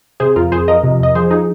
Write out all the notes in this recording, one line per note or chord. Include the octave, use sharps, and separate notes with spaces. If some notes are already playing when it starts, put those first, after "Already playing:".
C3 G#4 C5
F2 F4 A#4
F2 G#4 C5
F3 A#4 D#5
C3
F2 D#5
F3 G#4 C5
F3 D#4 G#4